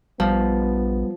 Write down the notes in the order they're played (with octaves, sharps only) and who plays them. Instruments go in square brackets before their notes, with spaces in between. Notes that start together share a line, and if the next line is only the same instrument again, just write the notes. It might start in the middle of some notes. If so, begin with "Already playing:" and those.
[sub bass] A#1 [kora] F3 [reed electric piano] G3 [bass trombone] B3